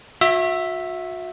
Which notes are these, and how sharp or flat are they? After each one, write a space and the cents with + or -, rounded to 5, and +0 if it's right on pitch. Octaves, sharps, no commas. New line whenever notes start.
F#4 -35 E5 +0